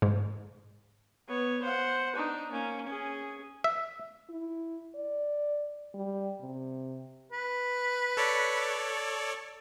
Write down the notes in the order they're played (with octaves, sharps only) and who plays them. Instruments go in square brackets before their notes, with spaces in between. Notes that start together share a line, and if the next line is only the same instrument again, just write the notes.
[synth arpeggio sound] G#2
[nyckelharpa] B3 C#5
C5 F#5
D4 D#4
A#3 C#4
C#4 G#4
[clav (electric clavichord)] E5
[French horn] E4
D5
G3
C3
[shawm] B4
[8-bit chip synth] A4 C#5 D5